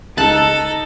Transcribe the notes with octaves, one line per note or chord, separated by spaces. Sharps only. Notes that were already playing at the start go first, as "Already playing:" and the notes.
C#2 D#4 A4 A5 F#6